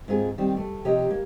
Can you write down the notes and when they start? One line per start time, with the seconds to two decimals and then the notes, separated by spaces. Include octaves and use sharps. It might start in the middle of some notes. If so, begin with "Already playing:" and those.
0.08 G#2 C4 F4 G#4
0.38 D#3 G3 C4 D5
0.57 A3
0.85 C3 F3 G4 C#5 D#5 A#5
1.11 A#3